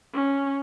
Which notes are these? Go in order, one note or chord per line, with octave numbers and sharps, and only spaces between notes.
C#4